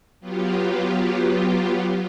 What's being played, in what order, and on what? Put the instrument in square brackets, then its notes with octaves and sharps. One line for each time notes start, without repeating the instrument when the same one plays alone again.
[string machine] F#3 B3 F4 G4